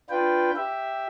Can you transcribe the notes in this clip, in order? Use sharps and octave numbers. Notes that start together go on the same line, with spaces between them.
D4 F4 B4 G5
G4 E5